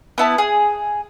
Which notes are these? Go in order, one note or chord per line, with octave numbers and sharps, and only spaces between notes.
B3 E4 A5
G#4